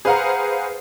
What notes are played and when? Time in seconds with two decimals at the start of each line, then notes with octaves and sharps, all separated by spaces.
0.05 G#4 B4 C5 F5 F#5 A#5